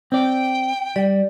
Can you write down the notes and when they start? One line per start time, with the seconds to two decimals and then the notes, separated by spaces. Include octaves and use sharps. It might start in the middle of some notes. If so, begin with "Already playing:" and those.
0.12 C4 D5 G5
0.96 G3 D5